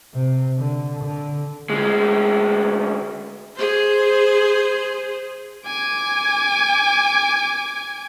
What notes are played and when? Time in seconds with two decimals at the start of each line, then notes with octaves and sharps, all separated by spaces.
0.14 C3
0.58 D3
1.04 D3
1.70 D2 G#3
3.55 G#4 C5
5.66 G#5 D6